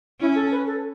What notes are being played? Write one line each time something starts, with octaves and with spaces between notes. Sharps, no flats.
C#4 E4
A4
B4
A4